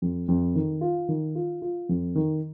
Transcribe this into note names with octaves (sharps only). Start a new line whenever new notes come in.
F2
F2
D#3
F4
D#3
F4
F4
F2
D#3